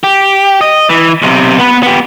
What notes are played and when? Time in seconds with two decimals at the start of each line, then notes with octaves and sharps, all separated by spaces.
0.04 G4
0.61 D#5
0.89 E3
1.22 B1 C3
1.58 B3 B4
1.83 B3 G4